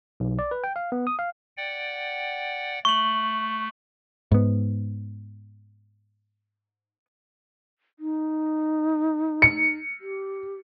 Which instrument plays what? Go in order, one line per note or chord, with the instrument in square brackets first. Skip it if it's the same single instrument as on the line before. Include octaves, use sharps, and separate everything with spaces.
[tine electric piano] B1
D5
B4
G5
F5
B3
D#6
F5
[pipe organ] D5 F#5 G5
[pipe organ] A3 [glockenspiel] C#6 F#7
[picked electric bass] G#2 B3
[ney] D#4
[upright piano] C#7
[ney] G4